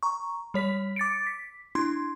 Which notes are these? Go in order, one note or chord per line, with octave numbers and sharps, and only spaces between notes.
A#5 C#6
G3 C#5 B6
D6 A6 C#7 D7
B6
D4 E4 C6 G#6